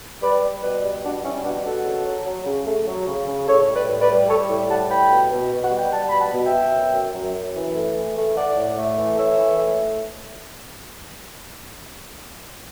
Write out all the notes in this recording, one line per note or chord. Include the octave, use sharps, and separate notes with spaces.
G3 B4 D5
G3
B2 B4 D5
G3
B2 D4 F#4
G3 C#4 E4
B2 D4 F#4
B2 F#4 A4
C#3
F#3
F#3
C#3
A3
F#3
C#3
C#3
A2 A4 C#5
G3
B4 D5
A2
B4 D5
G3
G3 A4 C#5
A2
G3 F#5 A5
A2 G5 B5
B2
B2
B2
F#5
G3
G5
G3 F#5 A5
B2 B5
F#5 A5
B2
E5 G5
B2
F#2
F#2
F#2
F#2
E3
A3
E3
A3
A3 D5 F#5
A2
A3
E3
A3 C#5 E5
E3
A3